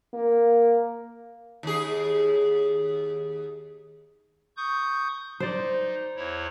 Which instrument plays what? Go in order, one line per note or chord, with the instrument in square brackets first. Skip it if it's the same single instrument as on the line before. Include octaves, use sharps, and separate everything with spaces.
[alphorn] A#3
[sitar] D#2 G#4
[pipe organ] C#6 D#6 G6
[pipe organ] D#4 [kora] C5 D5
[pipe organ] E2 E4 C#5